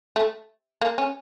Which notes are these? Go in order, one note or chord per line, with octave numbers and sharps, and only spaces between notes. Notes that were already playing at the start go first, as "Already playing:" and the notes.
A3
A#3
C#4